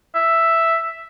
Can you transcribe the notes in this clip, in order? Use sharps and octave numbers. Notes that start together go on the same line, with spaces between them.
E5